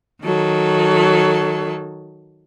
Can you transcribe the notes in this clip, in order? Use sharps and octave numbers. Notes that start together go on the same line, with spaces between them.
D#3 F#3 A4